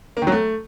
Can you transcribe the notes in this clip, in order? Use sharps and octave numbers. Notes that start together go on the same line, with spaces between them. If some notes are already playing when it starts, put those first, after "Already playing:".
A#3
D#3
F#3
A3